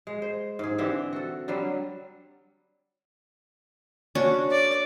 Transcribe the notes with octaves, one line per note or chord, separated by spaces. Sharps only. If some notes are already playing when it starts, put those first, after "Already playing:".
G#3
C5
G#2 G#4
D3 E3 C4 G4
F#4 A4
D3 F#3 G3
C#4 D4 F#4
D5